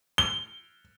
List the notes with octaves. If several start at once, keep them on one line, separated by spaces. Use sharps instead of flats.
G7